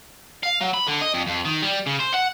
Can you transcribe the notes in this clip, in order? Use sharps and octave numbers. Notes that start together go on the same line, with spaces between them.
F5
F#3
B5
D3
D#5
F2
F2
D#3
G3
C#3
C5
F#5